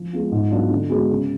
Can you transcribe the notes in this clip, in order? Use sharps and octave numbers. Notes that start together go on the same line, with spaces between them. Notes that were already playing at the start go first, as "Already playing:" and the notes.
Already playing: F3
G#3 B3 F4
G#2
F#3 B3 D4 F4
D3
G#3 B3 F#4
C#3